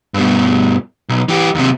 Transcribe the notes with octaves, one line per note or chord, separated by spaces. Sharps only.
G2 B2
B1
E3 G4
D#2 C3